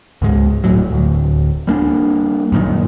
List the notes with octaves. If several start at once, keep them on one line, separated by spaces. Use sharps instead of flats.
C#2 G#2 G#3
D#1 A2 F#3
D1 D2
G3 A#3 D4
F#2 A#2 D#3